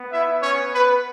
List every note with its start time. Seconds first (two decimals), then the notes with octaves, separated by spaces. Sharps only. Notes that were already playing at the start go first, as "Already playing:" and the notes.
Already playing: B3
0.13 E4 E5
0.43 C#4 C#5
0.73 B4